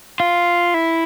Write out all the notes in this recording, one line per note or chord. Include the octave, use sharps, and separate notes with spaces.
F4
E4